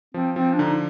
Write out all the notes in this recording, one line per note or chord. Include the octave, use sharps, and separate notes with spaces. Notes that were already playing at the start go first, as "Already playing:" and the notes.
F3 C4
F3 C4
D4
D3 D#4